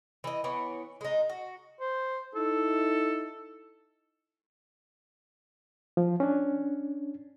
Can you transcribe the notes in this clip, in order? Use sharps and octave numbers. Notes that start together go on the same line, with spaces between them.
E3 D#5
E3 B3 C#5
G#3 D#4
F#4
C5
D#4 E4 A4
F3
C#4 D4